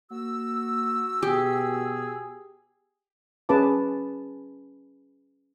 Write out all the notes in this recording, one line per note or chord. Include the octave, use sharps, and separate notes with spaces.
A#3 F#4 E6
B2 G4 G#4
C#4 G#4 B4 A5 D6